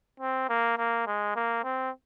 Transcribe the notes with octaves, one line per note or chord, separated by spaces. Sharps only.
C4
A#3
A#3
G#3
A#3
C4